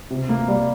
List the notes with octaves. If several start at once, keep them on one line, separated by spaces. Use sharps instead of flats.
C3
A#3
G3